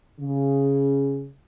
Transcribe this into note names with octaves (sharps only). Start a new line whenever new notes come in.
C#3